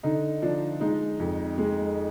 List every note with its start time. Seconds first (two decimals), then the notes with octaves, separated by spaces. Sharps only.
0.03 D3 D#4
0.42 F3 D4
0.80 G#3 D#4
1.20 F2
1.58 G#3